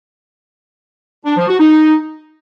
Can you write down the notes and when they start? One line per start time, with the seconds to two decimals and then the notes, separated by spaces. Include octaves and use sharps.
1.25 D4
1.37 F3
1.48 F#4
1.60 D#4